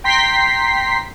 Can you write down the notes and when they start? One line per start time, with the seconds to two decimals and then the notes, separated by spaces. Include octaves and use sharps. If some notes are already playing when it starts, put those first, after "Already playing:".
0.04 G5 A#5 C6 B6 C7